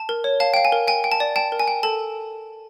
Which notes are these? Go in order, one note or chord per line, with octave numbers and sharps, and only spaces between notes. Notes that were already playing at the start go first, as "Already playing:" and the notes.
Already playing: A5
A#4
C#5
F5 A5
F5 G5
G#5
A#4
G5 G#5
G5
A5
D5
G5 A5
A#4
G#5
G5
A4 A5